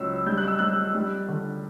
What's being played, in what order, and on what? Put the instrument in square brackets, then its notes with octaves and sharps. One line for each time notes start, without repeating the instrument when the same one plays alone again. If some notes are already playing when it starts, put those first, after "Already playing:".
Already playing: [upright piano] C#2 F#3 E6
G3 G6
F#6
E6
G3 F#6
G3
D3